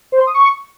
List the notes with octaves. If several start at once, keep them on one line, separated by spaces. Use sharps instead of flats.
C5
C6
D#6
C#6